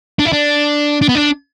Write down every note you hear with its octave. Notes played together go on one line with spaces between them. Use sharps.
D4
E4
D4
D4
B3
D4